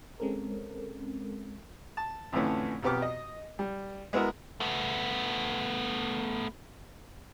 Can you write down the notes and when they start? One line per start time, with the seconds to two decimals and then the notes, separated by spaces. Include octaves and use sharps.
0.20 G#3 C4 C#4 A4 A#4
1.97 A5
2.32 F2 A2 D3 E3 A3 C#4
2.83 B1 F2 B3 G4 D6 F6
3.02 D#5
3.59 G3
4.13 G#3 B3 E4 F#4 A#4
4.60 A3 B3